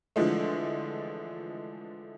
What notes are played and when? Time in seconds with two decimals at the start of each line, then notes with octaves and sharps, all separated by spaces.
0.16 D3 E3 F3 G#3 A3